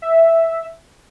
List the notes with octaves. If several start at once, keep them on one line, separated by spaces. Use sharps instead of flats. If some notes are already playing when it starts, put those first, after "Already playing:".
E5